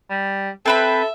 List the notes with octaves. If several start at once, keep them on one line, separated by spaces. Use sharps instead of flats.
G3
C4 A4 B4 E5 B5